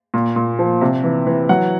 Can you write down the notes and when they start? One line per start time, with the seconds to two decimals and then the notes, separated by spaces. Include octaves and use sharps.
0.14 A#2
0.36 A#2
0.59 F3
0.81 C3
1.04 E3
1.27 E3
1.49 F#3 F#5